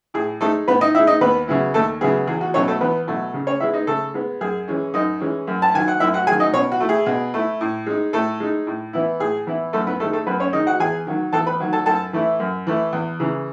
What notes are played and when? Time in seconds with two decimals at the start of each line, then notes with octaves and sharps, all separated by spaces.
0.14 A2 G#4
0.41 G#3 A3 D#4 A4
0.68 A2 B3 B4
0.81 D#4 D#5
0.95 D#4 E4 E5
0.99 G#3
1.07 D#4 D#5
1.21 D#2 B3 B4
1.48 C#3 F#3 B3 E4
1.74 D#2 A3 A4
2.01 C#3 F#3 B3 E4 G#4
2.27 E2 G#4
2.41 F#4
2.54 B2 F#3 A3 C#4 C#5
2.68 A3 A4
2.81 E2 B3 B4
3.08 B2 F#3 A3
3.34 C#3
3.47 C#4 C#5
3.60 B3 E4 E5
3.63 G#3
3.74 D#4 D#5
3.87 C#3 A3 A4
4.14 G#3 B3
4.41 F#2 G#4
4.68 E3 G#3 C#4
4.94 F#2 D#4 D#5
5.20 E3 G#3 C#4
5.47 F#2
5.62 A5
5.74 D#3 F#3 G#5
5.88 F#5
6.00 F#2 E4 E5
6.14 F#4 F#5
6.27 F#3 G#4 G#5
6.31 D#3
6.40 D#4 D#5
6.53 B2 C#4 C#5
6.72 F#4
6.80 A3 E4
6.89 G#4
7.06 B2
7.34 A3 E4
7.61 A2
7.87 G#3 D#4
8.13 A2 A3 A4
8.40 G#3 D#4
8.67 A2
8.93 E3 B3 E4
9.20 A2 G#4
9.47 E3 B3 E4
9.73 F#2 A3 A4
9.87 B3 B4
10.00 D#3 G#3 A3 D#4 A4
10.13 A3 A4
10.26 F#2 B3 B4
10.40 C#4 C#5
10.53 D#3 G#3 D#4 D#5
10.66 F#4 F#5
10.80 E2 G#4 G#5
11.07 D#3 F#3
11.33 E2 A4 A5
11.47 B4 B5
11.60 D#3 F#3
11.73 A4 A5
11.86 F#2 A4 A5
12.13 E3 A3 E4
12.40 F#2
12.67 E3 A3 E4
12.93 E2
13.20 C#3 E3